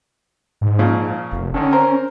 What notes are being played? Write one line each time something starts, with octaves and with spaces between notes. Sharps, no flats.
G#2
A#2 C#3 F3
F1
D3 D#3 C#4
C4 A#4 C5